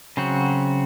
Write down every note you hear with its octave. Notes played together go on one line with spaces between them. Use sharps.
C#3 F#3 C4 F#4